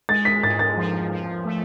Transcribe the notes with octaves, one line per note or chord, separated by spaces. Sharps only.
G#3 A6
B6
G#2 A6
A6
F3
F3
A3